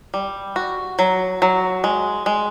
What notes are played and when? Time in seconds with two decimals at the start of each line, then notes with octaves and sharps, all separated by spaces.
0.14 G3
0.56 F#4
0.99 F#3
1.42 F#3
1.84 G#3
2.26 G#3